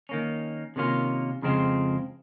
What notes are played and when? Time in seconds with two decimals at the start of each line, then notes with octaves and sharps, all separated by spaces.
0.09 D#3 A#3 C#4
0.76 C3 D#3 A#3 C#4 F4
1.42 F2 C#3 G#3 C4 F4